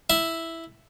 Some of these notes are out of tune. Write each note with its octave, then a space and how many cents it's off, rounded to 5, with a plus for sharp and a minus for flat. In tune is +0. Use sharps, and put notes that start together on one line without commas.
E4 +0 E5 +0